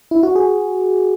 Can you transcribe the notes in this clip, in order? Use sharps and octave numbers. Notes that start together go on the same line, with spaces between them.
E4
F#4
G#4